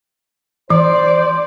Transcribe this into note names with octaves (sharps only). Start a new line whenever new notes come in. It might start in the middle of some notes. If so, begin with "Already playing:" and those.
E3 C5 D5